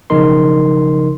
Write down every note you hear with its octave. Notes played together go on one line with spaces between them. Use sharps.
B1 C#3 F3 D#4 A#4 C6